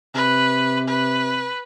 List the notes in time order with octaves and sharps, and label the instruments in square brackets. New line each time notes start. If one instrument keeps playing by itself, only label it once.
[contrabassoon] C3 [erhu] B4
[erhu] B4